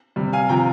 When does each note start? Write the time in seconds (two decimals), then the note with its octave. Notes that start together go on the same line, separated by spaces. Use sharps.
0.16 C3 G3
0.33 F5 G#5
0.49 C3 F3 G5 A#5